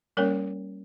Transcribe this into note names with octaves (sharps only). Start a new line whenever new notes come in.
G3 A#3 C#4 A#4 C#5